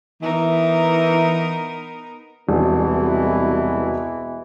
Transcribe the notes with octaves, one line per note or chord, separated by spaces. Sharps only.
E3 B3 D#4 A#4
E1 C2 B2 E3 G#3